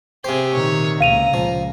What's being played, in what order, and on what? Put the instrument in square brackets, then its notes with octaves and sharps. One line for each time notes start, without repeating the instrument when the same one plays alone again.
[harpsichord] C3 C5 [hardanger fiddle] G4 G#4
[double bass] A#2 D#3 [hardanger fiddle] C#5
[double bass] C#2 A#2 [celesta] F5 D#7 F7 [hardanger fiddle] A#5
[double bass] C#2 [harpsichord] F3